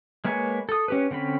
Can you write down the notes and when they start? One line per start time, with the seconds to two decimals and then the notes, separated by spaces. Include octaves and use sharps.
0.25 G#3 A#3 B4 C#5 G#5
0.69 A4 D#6
0.88 C#4 G4 B4
1.11 D3 C4 C#4 B5